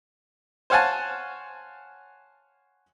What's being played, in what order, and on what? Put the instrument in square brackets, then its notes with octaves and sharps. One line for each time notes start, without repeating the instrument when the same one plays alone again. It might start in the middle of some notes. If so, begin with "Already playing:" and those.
[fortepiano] C5 C#5 F5 F#5 G#5 A5